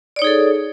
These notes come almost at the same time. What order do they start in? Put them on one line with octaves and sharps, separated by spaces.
D5 C#5 D#4 G#4 A4